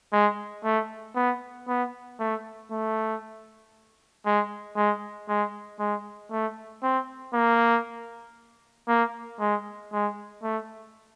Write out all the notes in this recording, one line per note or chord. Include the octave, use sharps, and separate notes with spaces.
G#3
A3
B3
B3
A3
A3
G#3
G#3
G#3
G#3
A3
C4
A#3
A#3
G#3
G#3
A3